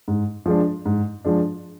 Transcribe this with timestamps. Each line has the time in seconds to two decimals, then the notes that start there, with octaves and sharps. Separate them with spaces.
0.08 G#2
0.46 F3 G#3 D4
0.85 G#2
1.25 F3 G#3 D4